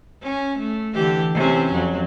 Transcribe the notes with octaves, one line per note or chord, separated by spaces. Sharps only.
C#4
A3
D3 E3 G4
C3 E3 C#4
F2 F#3